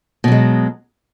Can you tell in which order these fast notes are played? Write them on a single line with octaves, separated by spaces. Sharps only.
B2 F#3 G#3